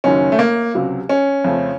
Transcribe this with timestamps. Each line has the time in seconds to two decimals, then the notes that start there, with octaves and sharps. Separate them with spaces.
0.04 F#1 F#2 D#3 C#4
0.32 A3
0.39 A#3
0.74 C#2 C3 F#3
1.09 C#4
1.45 F2 C#3 F3 A3